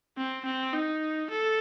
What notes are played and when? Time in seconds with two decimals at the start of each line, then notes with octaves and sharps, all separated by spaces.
0.17 C4
0.45 C4
0.73 D#4
1.31 A4